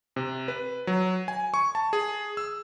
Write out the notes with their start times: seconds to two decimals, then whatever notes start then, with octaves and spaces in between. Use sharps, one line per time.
0.16 C3
0.48 B4
0.87 F#3
1.28 G#5
1.54 C#6
1.75 A5
1.93 G#4
2.37 E6